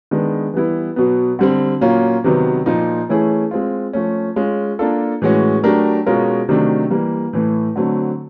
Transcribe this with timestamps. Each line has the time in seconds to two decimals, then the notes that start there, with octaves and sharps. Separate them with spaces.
0.11 D#3 G#3 B3 D4
0.54 E3 G3 B3 E4
0.96 B2 F#3 B3
1.39 D3 G3 C4
1.81 A#2 F#3 A#3 C#4 F4
2.24 C3 D#3 F#3 B3
2.66 A#2 F3 A#3 D#4
3.09 E3 A3 C#4 E4 G#4
3.51 G#3 C4 F4
3.93 F3 A3 C#4
4.36 G#3 C#4 F4
4.79 A#3 D4 F4 A4
5.22 A2 E3 G#3 C#4 F#4
5.64 F#3 A3 D4 G4 A#4
6.06 B2 G#3 C#4 F4 A#4
6.49 C3 D#3 F#3 A3 D4
6.90 E3 G3 A#3
7.33 A2 E3 A3
7.76 D3 F#3 A3 C4